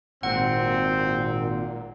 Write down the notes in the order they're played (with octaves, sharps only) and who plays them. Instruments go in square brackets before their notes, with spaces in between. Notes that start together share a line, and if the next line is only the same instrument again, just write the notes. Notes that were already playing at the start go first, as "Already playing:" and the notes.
[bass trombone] G#1 [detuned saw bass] A#2 [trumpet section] C4 [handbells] F#5